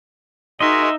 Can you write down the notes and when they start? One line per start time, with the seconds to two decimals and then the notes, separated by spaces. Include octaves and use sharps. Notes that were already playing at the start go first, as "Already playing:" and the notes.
0.60 D#4 F#4 G#4 A#4 D#5 E5 C6